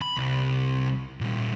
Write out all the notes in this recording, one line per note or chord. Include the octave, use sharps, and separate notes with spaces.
B5
C2
A#2 G3